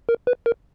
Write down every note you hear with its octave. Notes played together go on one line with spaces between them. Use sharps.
A#4
B4
A#4